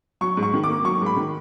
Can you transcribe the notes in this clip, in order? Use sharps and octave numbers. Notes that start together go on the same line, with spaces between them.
F#3 C#6
G#2
C#6
D#3
D6
A#3
F#3 C#6
G#2
B5
D#3